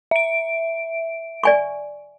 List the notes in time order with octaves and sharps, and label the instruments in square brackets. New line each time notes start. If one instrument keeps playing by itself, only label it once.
[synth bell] E5 D7
[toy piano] D5 G#5 C#6